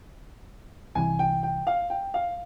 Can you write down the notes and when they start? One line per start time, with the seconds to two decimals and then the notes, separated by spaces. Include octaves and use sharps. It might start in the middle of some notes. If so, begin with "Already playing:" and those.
0.95 C2 C3 E3 G#5
1.19 G5
1.43 G5
1.67 F5
1.90 G5
2.14 F5